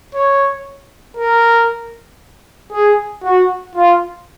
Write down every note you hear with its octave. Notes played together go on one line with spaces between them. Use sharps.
C#5
A#4
G#4
F#4
F4